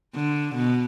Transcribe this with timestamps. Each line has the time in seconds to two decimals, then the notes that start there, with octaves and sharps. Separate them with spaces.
0.16 D3
0.55 B2